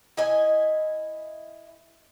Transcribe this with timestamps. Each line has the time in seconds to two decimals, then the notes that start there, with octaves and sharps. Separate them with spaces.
0.17 E4 D#5 G#5